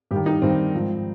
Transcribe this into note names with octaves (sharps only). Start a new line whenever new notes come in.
G2 D#3 G4
D#4
G2 D#3 C4
G#2 F3